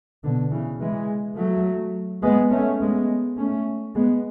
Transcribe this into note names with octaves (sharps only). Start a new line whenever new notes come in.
B2 D3
C#3 E3
E3 G#3
F#3 A3
G#3 B3
A3 C#4
G#3 B3
A3 C#4
G#3 B3